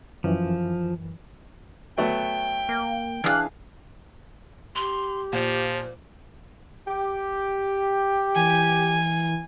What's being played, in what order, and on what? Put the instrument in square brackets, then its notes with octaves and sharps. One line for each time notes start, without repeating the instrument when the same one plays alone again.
[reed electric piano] F#2 E3 [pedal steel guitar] F3
[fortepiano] F#3 A3 B3 [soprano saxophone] G5
[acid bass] A#3
[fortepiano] E3 G#4 F5 [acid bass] D4 [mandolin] F6 F#6
[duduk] G4 [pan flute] C6 [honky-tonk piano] F7
[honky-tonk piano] A#2 [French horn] F3 [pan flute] C5
[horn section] G4
[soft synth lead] E3 [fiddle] G#5